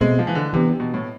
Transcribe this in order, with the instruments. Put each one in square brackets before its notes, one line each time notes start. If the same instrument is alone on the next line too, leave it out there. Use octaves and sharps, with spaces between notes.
[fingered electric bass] B2 A3 C4 [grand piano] G#3
[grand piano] F3
E3
D3
[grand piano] C3 [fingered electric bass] E3 G#3 B3 D4
[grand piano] B2
A2